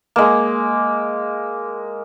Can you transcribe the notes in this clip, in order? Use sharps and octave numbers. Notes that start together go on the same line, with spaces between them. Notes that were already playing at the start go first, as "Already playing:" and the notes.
G#3 A#3